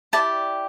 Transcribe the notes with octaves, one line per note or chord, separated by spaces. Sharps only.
E4 G4 D5 A5